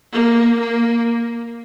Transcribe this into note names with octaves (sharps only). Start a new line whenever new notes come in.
A#3
A#3